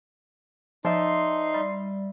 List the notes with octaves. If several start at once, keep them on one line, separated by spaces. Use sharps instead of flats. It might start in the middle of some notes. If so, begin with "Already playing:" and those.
F3 D#4 D5 E5 C6
G3